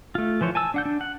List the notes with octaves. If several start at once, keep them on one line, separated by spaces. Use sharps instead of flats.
A3 F4
E3 F3 C5 C#5
G#5 A5 E6
D4 F#5 G6
D4
F#5